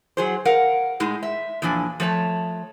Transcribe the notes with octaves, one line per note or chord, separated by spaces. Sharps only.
F#3 G#4 C5
A#4 F5 F#5
A2 G#3 D#4
E5
E2 A#2 F3 D4 G#5
F3 A3 C#5 A5